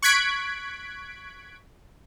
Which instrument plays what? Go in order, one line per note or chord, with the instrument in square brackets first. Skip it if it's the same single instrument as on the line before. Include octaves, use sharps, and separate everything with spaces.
[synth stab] C#6 F#6 G#6 B6 D7